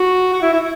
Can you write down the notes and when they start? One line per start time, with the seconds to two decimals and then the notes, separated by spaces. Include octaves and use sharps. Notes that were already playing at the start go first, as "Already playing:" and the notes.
Already playing: F#4
0.33 F#4
0.42 E4
0.53 E4